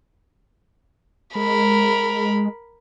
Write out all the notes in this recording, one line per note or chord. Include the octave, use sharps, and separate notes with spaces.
G#3 A#4 B5